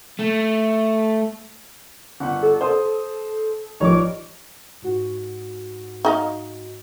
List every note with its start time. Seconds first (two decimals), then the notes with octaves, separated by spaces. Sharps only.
0.19 A3
2.20 G1 F#5
2.43 A4
2.61 C5 D#6
3.80 A1 G2 F3 D#4 C#5 D6
4.82 G#2 F#4
6.05 D#4 D#5 F5